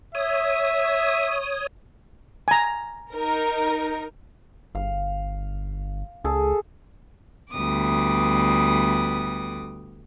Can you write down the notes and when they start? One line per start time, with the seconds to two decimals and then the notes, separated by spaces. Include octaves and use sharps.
0.15 C#5 E5 D#6
2.48 G#5 A#5
3.13 D#4 A#4
4.75 G1 F5
6.24 C#2 G#4 A4
7.53 D2 G3 B3 D6 D#6